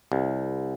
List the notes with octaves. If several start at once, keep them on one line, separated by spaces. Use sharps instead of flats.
C2